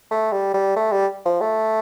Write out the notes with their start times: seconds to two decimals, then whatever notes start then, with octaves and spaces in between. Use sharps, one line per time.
0.11 A3
0.32 G3
0.54 G3
0.76 A3
0.92 G3
1.25 F3
1.41 A3